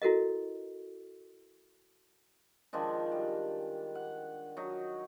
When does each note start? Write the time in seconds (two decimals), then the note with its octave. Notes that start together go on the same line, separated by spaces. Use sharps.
0.02 E4 F#4 A4 A#4 D#5
2.73 D#3 F3 G#3 D4
3.12 G3
3.95 F#5
4.57 F#3 D#4